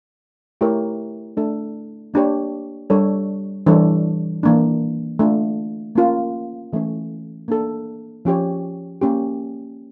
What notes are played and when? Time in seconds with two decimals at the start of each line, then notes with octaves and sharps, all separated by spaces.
0.61 A3 E4 G4 A#4 C#5
1.37 A3 D4 A4
2.14 A#3 D4 G4 C#5
2.90 G3 D4 A4 C#5
3.66 E3 G3 D4 A4 C#5
4.43 E3 A#3 D4
5.19 A3 D4 F4
5.95 A#3 C#4 F4 A#4
6.73 E3 A3 C#4
7.48 A#3 D4 A4
8.25 F3 C#4 G4 C#5
9.01 A#3 C#4 G4